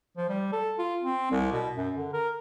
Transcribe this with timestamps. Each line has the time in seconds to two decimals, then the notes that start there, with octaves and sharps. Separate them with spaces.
0.17 F3
0.29 G3
0.52 A4
0.79 F4
1.03 C4
1.31 C2
1.52 B2
1.76 F#2
1.97 D3
2.13 A#4